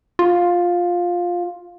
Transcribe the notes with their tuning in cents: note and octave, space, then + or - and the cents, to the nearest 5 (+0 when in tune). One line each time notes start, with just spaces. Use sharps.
F4 +10